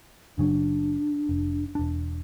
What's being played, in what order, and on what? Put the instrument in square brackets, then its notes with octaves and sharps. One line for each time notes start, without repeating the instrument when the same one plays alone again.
[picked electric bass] F#1 C#3 F#3 [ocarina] D4
[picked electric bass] F1
E1 D4